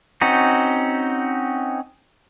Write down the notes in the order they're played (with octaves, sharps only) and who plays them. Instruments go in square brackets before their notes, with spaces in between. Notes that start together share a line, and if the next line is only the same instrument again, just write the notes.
[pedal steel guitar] C4 C#4 D#4 F#4